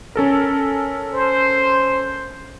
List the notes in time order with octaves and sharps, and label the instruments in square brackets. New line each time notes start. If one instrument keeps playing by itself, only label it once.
[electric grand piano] C#4 A4 A#4
[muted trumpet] C5